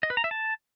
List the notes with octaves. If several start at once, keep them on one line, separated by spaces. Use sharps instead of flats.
D#5
B4
A#5
E5
A5